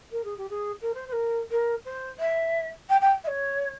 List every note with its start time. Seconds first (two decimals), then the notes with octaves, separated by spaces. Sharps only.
0.11 A#4
0.24 G#4
0.37 G4
0.49 G#4
0.81 A#4
0.94 C5
1.07 C5
1.12 A#4
1.51 A#4
1.84 C5
2.19 E5
2.89 G5
3.01 G5
3.24 E5
3.27 C#5